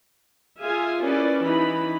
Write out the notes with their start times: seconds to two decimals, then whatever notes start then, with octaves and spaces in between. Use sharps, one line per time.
0.61 F4 G#4 E5 F5 G#5
1.02 C#4 E4 G4 A#4 B4 D5
1.41 E3 D#4 B5